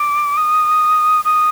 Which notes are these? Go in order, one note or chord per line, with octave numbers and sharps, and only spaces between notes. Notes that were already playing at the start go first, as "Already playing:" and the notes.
Already playing: D6
D#6
D#6